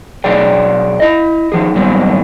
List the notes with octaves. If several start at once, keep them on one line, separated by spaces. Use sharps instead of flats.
B2 F#3 G#4 D5 G5
E4 D#5
D#3 F3 G#4
G#2 D#3 F#3 G3 B3 C4